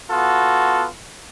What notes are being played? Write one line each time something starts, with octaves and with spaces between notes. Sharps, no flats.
B3 F4 F#4 A4